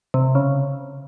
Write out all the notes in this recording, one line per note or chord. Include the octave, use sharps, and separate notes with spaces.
C3
C#3